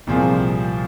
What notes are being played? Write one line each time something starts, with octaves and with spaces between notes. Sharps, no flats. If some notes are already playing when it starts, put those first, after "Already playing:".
C2 A#2 F3 C4 G#4